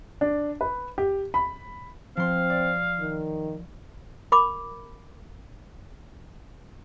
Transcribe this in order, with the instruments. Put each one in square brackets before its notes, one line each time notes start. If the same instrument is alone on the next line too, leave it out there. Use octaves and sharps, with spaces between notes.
[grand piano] D4
B4
G4
B5
[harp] F3 C6 [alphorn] C4 [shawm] F5
[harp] D5
[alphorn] D#3
[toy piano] A#4 B5 D6